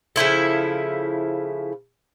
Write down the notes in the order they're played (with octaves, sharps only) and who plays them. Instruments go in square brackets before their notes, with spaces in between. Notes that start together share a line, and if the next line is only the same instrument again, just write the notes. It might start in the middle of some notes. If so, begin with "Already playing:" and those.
[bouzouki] C#3 F3 E4 A4